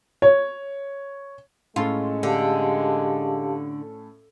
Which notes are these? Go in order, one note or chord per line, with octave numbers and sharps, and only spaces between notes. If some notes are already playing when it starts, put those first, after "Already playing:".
C#5
A2 G#3 C#4 F4 A4
D3 G4 F5 A5